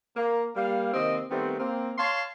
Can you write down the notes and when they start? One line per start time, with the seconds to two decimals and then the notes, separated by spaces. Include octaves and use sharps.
0.16 A#3
0.56 G3 A#3 F5
0.94 C3 D#3 A#3 C4 C5 D#5
1.30 D#3 G3 A3 B3 C4
1.59 A#3 C4
1.98 C#5 F5 A5 C6